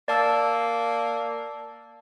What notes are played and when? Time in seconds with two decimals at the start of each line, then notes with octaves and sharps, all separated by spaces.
0.08 A#3 D5 A5 E6